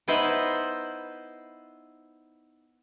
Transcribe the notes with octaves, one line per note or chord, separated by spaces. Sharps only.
B3 D#4 E4 B4 C5